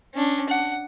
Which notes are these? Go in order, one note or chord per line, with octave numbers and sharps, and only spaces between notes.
C#4 D4
F#5